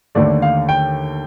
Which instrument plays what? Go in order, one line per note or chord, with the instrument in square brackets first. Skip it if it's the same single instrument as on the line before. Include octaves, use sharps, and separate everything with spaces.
[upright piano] D#2 D3 A3 D5
F5
G5